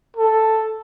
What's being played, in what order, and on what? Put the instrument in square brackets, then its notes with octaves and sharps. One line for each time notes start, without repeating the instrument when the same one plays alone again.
[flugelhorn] A4